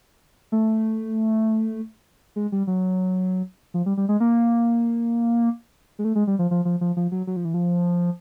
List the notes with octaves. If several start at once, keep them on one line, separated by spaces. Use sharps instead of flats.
A3
G#3
G3
F#3
F3
G3
G3
G#3
A#3
G#3
A3
G#3
G3
F3
F3
F3
F3
F3
F#3
F#3
F3
E3
F3